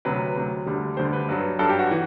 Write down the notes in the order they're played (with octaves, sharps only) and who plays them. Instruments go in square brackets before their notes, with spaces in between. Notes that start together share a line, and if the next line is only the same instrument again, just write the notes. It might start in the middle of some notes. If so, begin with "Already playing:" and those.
[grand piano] D2 C3 F#3 B4
D2 C3 F#3
D2 D3 G3
D2 D3 G3 C5
B4
G2 F#3
G2 F#3 A4
G4
F#4
E3